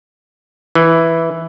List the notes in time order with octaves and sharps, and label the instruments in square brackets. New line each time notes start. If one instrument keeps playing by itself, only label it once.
[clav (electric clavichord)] E3